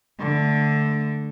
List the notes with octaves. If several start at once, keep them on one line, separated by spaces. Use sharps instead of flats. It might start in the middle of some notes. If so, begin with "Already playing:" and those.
D3 A3